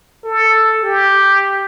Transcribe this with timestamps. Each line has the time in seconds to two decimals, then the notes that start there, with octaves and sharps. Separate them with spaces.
0.25 A4
0.83 G4